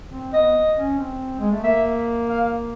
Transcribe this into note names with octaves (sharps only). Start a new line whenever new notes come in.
C4
B3 D#5
C#4
C4
G#3
A3
A#3 E5
F5